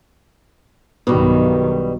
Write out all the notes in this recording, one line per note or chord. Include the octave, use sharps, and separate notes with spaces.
B1 G2 B2 D#3 G3